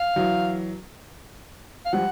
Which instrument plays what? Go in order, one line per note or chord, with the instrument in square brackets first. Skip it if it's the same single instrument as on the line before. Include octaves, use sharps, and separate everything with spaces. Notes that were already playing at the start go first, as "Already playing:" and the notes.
Already playing: [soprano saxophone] F5
[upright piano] E3 F#3
[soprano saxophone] F5
[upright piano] F3 G3 [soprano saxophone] F#5